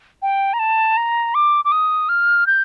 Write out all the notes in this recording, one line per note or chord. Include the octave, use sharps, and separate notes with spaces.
G5
A#5
A5
A#5
D6
D6
D#6
F6
G6